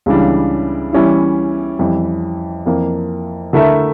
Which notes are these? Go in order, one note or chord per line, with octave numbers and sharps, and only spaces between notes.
C#2 C#3 E3 G3 D4
E3 G3 C#4 E4
F2 E3 G3
F2 E3 A#3
D3 A3 E4 A#4 E5